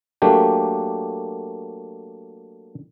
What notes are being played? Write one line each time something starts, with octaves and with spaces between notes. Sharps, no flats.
F#3 A3 A#3 D4 G4